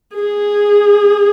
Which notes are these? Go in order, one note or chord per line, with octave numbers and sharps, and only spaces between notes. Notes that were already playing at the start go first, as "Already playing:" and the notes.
G#4